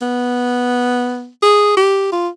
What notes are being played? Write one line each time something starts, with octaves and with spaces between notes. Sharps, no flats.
B3
G#4
G4
F4